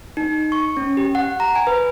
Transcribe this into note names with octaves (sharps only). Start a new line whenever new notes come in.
D#4
C#6
C#4
G4
F#5
A#5
G#5
B4